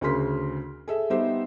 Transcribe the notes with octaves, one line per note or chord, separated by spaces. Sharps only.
D2 C#3 G#4 A#4 C6 B6
G#4 A4 E5
G3 B3 D#4 G4 C5 E5